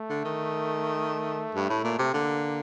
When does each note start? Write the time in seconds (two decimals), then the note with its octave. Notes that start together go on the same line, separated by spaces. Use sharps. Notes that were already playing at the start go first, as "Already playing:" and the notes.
Already playing: A3
0.10 D3
0.25 D#3
1.55 G2
1.70 A2
1.84 A#2
1.99 C3
2.13 D3 A#3